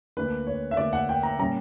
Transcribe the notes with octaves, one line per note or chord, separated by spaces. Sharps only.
D2 D3 A#3 D4 B4
C#5
E5
D2 D3 A#3 D4 D5
F#5
G5
A#5
A#2 G3 C#4 A#5